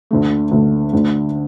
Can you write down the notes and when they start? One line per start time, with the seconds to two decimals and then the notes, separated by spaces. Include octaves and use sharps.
0.11 D2 D3 A3
0.51 D2 D3 A3
0.93 D2 D3 A3